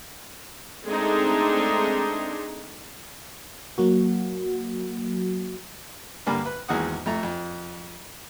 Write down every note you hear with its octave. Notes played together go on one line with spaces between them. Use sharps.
G#3 A3 C4 D4 D#4
F#3 A#3 F#4
G2 D3 A#3 B5
B4
G#1 E2 A#3 G#4 F#5 D#6
F2 A3 A#5
F2